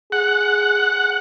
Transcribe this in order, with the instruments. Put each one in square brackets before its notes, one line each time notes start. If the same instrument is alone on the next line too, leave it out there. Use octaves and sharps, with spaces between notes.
[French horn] G#4 [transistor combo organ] F#5